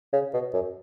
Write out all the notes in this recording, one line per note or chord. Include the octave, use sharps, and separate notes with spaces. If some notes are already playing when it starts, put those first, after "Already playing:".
C#3
B2
F#2